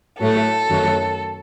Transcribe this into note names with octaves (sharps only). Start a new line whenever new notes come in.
A2 F#3 A3 A4
F#2 D#3 F#3 A3